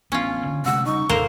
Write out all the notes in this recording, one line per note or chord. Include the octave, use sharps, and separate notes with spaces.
A1 B3 C#4 D4 F4
D3 A#3
C3 G#3 A3 F#5 E6
C#3 G3 D#4 C#6
G#1 D#2 A#3 A4 A#4 C5